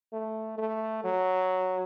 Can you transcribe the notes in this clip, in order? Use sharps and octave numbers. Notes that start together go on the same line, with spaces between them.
A3
A3
F#3